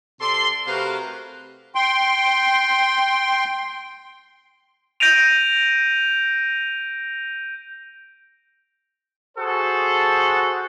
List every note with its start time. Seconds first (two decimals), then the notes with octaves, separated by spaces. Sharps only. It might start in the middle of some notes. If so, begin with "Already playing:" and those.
0.21 C3 A4 D5 C6
0.67 C3 A3 F#4 A#4 B4 F5
1.75 G5 C6
5.00 G6 A#6 D7 D#7 F7
9.37 F#4 G#4 A4 C5